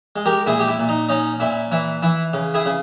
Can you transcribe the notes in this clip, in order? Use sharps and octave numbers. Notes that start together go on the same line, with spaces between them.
G#3
G4 A#4
A#2 E4 G#4
G4
E4
A#2
D#4
C#4 D#4
A#2 E4
E3 E4
E3 E4
C#3
E4 G#4
C#3